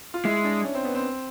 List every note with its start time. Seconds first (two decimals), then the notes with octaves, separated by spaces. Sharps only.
0.14 F4
0.25 G#3 E4
0.44 D4
0.64 C#4
0.75 C4
0.85 B3
0.95 C4